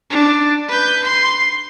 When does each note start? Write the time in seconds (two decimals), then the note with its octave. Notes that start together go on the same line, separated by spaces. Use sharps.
0.10 D4
0.68 B4 G6
1.04 C6